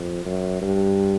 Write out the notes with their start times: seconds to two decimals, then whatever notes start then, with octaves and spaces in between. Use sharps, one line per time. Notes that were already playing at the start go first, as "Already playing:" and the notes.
Already playing: F2
0.25 F#2
0.62 G2